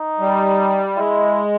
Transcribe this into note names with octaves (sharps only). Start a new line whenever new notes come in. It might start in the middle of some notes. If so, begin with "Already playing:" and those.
Already playing: D#4
G3
G#3 E4